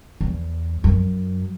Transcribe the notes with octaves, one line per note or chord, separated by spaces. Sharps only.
E2
F#2